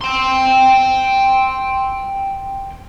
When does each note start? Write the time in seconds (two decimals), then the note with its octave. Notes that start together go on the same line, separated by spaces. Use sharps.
0.01 G5 C6